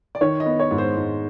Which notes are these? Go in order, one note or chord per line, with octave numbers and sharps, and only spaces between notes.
D5
D#3 C#5
D#5
B3
C#5
G#2
C5
G#2